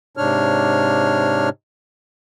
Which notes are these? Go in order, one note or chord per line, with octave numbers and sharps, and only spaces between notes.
G#2 C3 D4 C#5 F6